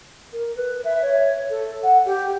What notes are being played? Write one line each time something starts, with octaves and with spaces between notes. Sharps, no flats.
A#4
B4
E5
C#5
A4
F#5
G4